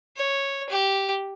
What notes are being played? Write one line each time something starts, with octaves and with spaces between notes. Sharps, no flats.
C#5
G4